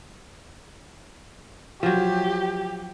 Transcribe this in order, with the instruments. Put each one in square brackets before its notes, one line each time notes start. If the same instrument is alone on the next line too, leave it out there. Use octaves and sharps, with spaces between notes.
[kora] F3 F#3 [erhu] G4